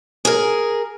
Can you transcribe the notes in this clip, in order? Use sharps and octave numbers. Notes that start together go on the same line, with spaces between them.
G#4 A#4